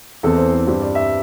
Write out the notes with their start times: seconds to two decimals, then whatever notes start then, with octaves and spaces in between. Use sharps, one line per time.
0.23 E2 E3 C4 A4
0.38 C5
0.53 A4
0.67 G2 G3 C4 C5
0.82 D5
0.95 E5